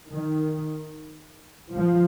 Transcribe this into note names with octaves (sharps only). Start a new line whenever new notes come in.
D#3
F3